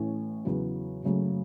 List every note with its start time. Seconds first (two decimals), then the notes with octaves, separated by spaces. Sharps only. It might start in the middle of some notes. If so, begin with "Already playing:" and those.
Already playing: A1 A2 E3 A3 C#4
0.45 E2 C#3 F#3 B3 F#4
1.03 F#1 F#2 C#3 F#3 A3